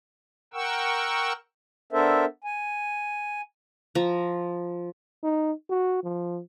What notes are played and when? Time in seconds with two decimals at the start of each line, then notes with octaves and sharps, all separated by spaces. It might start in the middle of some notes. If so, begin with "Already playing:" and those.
0.54 A#4 F#5 G5 C#6 E6
1.93 B3 D4 A4 A#4 C5 E5
2.44 G#5
3.95 F3 A#5
5.23 D#4
5.70 F#4
6.04 F3